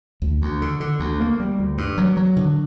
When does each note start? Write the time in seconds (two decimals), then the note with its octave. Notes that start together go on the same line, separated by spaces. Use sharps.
0.22 D2
0.42 D2
0.62 D3
0.80 D3
1.00 D2
1.20 A#3
1.40 G3
1.59 D2
1.78 G2
1.98 F#3
2.17 F#3
2.36 D3